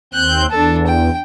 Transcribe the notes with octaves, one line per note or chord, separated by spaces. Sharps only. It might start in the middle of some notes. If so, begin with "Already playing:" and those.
D#2 C4 F#6 G6
E2 D4 A4
G5